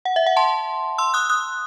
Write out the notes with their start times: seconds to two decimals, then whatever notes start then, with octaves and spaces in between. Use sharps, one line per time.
0.05 F#5
0.16 E5
0.26 F#5
0.37 A5 C6
0.98 C6 E6
1.14 D#6 F#6
1.29 D#6 F#6